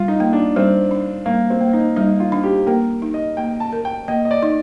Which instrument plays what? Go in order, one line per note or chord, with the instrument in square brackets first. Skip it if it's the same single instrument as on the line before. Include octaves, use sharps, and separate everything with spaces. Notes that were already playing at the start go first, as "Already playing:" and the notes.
Already playing: [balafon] G3 [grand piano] F4
[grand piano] D#4
[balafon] A#3
[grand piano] D4
[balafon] G3 [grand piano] C4
[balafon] D4
[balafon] G3 [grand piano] A#3
[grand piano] C4
[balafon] A#3
[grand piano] D#4
[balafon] G3 [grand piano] D#4
[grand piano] F4
[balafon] D4
[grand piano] G4
[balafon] A#3 [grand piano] A#4
[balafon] D#4
[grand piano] D#5
[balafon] A#3 [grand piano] G5
[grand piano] A5
[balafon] A#4
[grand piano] G5
[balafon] A#3 [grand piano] D#5
[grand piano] D#5
D5
[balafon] D#4